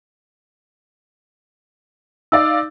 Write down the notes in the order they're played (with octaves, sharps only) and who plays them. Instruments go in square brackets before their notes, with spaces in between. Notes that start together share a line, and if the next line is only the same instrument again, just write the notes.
[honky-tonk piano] D#4 D5 F5 [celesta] E6